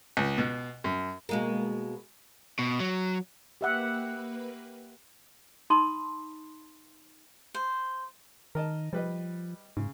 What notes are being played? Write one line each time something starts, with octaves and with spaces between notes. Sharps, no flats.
C#2
B2
F#2
B2 G#3 A#3
B2
F#3
A#3 G4 B4 E5 F#5
D#4 A5 B5 C6 D#6
C5
D#3 A#4 D#5 A5
F3 G3 B4 D#5
G#2 C#3